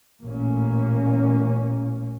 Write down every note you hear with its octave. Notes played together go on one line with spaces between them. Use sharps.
A1 A#2 A#3 C#4